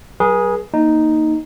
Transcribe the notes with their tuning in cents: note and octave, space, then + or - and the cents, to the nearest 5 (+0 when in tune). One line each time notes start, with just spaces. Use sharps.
F#3 +45 G#4 +0 B4 -45
A#3 +0 D#4 +0